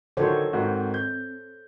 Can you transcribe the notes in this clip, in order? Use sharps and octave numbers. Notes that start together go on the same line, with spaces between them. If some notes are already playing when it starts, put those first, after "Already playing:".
D3 D#3 F#3 A4 C5 C#5
G#2 D#3 C4 F#4
G6